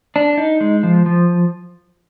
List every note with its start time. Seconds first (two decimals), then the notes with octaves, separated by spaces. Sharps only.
0.16 D4
0.38 D#4
0.61 G#3
0.83 F3
1.06 F3